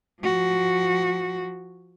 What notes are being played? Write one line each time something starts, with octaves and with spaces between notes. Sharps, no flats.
F3 F#4